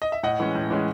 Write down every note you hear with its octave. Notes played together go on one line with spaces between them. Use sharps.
D#5
E5
A2 D#5 F#5
E3 G#3 C#4
A2
E3 G#3 C#4